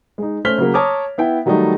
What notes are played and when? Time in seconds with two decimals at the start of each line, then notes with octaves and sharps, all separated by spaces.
0.18 G#3 D#4
0.45 A3 C#4 C5 F6 B6 G7
0.58 C#3 F#3 A#3
0.74 C#5 A5 A#5 D6 D#6 F6
1.18 B3 E4 G5
1.46 D#3 F#3 G3 A3 D#4